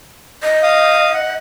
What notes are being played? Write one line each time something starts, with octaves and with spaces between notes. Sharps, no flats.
D#5
F5 D#6
F#5